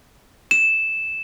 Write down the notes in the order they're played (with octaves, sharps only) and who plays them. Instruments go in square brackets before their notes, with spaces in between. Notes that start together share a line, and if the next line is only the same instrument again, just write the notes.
[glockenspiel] E7